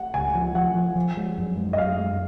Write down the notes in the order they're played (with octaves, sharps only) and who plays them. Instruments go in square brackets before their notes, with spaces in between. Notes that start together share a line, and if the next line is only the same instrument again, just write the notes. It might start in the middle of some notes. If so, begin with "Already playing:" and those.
Already playing: [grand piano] F#5
[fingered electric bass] C#2 [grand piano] G#5
[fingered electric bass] F3
[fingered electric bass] F3 [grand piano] F#5
[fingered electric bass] F3
F3
G#3
F#2
G#3
[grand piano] D#5
[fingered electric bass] F#2 [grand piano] F5
[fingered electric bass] G#3